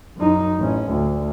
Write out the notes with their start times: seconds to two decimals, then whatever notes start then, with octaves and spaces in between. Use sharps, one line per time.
0.17 F#2 D#4
0.58 A1 C#4
0.89 D2